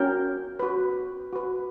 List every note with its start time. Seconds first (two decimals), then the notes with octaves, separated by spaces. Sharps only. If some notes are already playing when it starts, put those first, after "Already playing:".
Already playing: C#4 F#4 A#4 C#5 G5
0.59 F#4 B4
1.33 F#4 B4